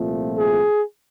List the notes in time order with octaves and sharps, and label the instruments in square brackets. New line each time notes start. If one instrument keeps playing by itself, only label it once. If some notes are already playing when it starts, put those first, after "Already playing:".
Already playing: [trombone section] C2 A#2 F3 A3 C4
G#4